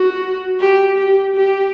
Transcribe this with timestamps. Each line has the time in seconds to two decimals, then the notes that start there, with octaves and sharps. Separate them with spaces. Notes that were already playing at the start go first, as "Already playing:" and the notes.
Already playing: F#4
0.59 G4
0.98 G4
1.36 G4